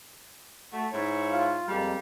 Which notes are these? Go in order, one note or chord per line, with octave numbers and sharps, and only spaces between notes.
A3 F#4
G#2 E4 C#5
F4 F5
F2 G3 G#3 A#3